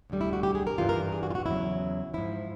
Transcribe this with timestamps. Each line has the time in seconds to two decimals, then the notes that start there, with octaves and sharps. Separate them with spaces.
0.10 D2 D3 G3
0.21 E4
0.33 F#4
0.43 G4
0.55 G#4
0.67 A#4
0.78 G2 E3 G3 F4
0.89 A#4
1.12 G#4
1.23 F#4
1.30 F4
1.35 F#4
1.46 E2 C#3 F#3 E4
2.14 G#2 F3 E4